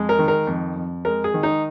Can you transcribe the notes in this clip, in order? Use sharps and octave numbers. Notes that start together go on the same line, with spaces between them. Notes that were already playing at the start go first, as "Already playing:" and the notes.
Already playing: F2 G#3
A#4
D#3
A#4
F2
F2
G#3 A#4
G#4
D#3
D#4